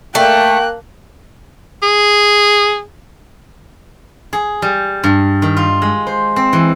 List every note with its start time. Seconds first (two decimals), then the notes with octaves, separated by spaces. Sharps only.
0.15 A3 A#3 G5 F#6
1.83 G#4
4.33 G#4
4.62 G3
5.04 G2
5.42 D#3
5.57 F4
5.82 G#3
6.07 C5
6.36 C4
6.53 E3